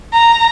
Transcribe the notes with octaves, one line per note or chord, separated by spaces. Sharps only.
A#5